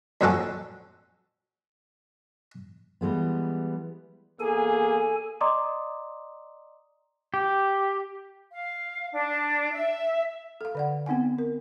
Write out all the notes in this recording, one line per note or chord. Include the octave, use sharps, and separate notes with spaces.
F2 A#2 F#3 C4 C#4 A4
E3 G3 G#3 B3
E2 A#3 G#4 A4 G#5
D5 D#5 A#5 C6 D6 D#6
G4
F5
D4
E5
A4 F5
D3 D5 F#5
B3 C4 D#4 F#5 G#5
A#4